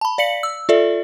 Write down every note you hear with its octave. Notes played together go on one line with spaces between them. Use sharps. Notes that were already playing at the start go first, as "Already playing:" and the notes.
A5 B5
D5 F5 B6 C#7 F#7
E6
F4 A4 D5 E5